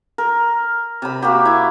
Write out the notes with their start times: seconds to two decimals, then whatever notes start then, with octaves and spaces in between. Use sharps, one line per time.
0.18 A#4
1.02 C3 B5
1.23 A#3 F#4 G4
1.45 E4